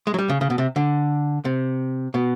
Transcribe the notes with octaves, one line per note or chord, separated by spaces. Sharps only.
G#3
F#3
G3
C#3
C#3
B2
C3
D3
C3
B2